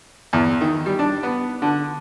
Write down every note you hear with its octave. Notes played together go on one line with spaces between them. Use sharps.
E2
D#3
G3
D4
B3
D3